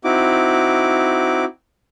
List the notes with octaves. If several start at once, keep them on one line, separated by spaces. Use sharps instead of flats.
C4 D#4 E4 F#4 D6